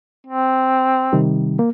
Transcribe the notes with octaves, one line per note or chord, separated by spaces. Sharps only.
C4
C3 D#3 G3
A#3